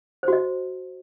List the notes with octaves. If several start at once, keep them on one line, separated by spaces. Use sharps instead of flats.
F#4 C5 D#5